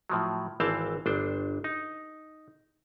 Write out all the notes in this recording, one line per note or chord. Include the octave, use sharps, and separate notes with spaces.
A2 F3 F#3
G#1 E3 C4 C5 F5 A5
G1 D4 C5
D#4